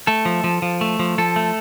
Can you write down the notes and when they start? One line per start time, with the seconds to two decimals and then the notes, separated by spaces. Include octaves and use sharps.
0.07 A3 A4
0.25 F3
0.44 F3
0.62 F3
0.81 A3
0.99 F3
1.18 F3 A4
1.36 A3